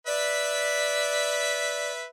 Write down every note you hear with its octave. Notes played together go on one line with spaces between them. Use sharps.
B4 D5 E5